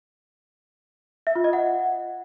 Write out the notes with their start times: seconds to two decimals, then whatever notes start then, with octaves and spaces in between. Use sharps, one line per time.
1.27 E5
1.36 F4
1.44 D#5
1.53 F#5